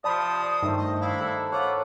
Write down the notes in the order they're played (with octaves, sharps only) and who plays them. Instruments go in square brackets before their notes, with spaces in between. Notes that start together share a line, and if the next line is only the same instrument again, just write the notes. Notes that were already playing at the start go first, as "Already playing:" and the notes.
[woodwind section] C3 F3 [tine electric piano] D5 A5 B5 [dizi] D#6
[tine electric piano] G2 D#4 [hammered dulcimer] D#3 A3 C5
[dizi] D#5
[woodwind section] D4 E4 [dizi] F5
[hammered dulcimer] A4 [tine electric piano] B5
[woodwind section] F4 F#5 [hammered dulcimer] C#5 [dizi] D6